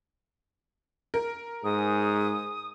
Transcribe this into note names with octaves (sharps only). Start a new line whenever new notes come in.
A#4
G#2 G#4 D#6